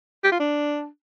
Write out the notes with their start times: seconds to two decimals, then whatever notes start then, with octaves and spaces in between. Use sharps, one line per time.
0.24 G4
0.32 F4
0.40 D4